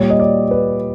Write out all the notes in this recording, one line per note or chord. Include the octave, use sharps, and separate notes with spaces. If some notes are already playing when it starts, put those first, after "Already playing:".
Already playing: A#2 G3 C#5
D#5
D5
B4